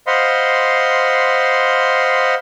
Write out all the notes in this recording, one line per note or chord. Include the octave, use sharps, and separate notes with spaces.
C5 D#5 F5 F#5 B5 C6